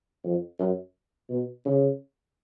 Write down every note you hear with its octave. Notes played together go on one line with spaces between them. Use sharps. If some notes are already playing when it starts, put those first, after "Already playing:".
F2
F#2
B2
C#3